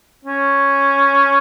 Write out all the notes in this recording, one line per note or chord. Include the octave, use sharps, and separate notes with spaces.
C#4